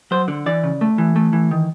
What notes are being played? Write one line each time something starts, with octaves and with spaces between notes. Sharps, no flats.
F#3 C5
D3
E3 D5
C#3
A3
E3
A3
E3
D#3